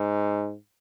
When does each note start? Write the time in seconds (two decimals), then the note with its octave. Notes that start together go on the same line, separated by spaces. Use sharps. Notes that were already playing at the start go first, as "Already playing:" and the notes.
Already playing: G#2